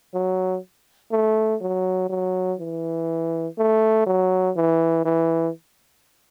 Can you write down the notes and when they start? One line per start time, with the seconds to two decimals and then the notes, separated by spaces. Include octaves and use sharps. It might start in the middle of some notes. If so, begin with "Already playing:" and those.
0.14 F#3
1.11 A3
1.61 F#3
2.10 F#3
2.59 E3
3.58 A3
4.07 F#3
4.56 E3
5.05 E3